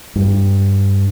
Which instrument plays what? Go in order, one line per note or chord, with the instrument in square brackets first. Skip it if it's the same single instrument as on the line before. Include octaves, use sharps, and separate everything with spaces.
[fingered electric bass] G2